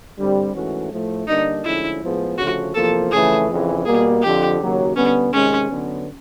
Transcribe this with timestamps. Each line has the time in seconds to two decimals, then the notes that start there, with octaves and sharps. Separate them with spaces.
0.17 G2 D3 G3 C4
0.54 G#2 E3 A3 C#4 F#4
0.91 A2 F3 A3
1.28 D3 G3 A#3 D4 D#4
1.64 D2 D3 F3 G#3 C#4 E4
2.02 A2 F3 G#3 B3
2.38 D2 C#3 F3 A3 F#4
2.75 E2 C3 F3 A#3 A4
3.12 F2 C#3 E3 A3 G#4
3.49 F2 C#3 E3
3.86 B2 G3 A#3 G#4
4.22 F2 D3 F3 G4
4.59 D#2 C#3 F#3 A#3
4.96 D3 G3 B3 C#4
5.33 C3 D#3 G#3 C#4
5.70 D3 F#3 B3